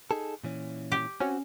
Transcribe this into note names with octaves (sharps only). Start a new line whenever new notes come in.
D#4 G#4 A4
A#2 E3 C#4
G4
C4 C#4 F#4